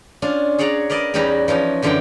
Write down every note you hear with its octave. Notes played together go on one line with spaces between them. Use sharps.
C#4 D4 F4
G#4 C#5 D5 F#5 A#5
A#4 B4 D5 D#5
E2 G3 C#4 D#4 B4 A#5
E3 F3 C#4 D#4
F#2 D3 E3 C#4 D4 G5